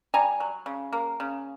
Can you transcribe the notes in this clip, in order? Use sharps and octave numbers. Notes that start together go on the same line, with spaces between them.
G3 G#5 A#5
F#3
C#3
A#3
C#3